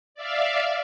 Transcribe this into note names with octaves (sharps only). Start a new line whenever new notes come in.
D5 E5 F5